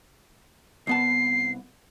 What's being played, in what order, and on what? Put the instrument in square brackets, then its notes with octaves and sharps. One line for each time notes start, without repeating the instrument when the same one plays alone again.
[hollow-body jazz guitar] C2 B3 A5 [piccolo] C7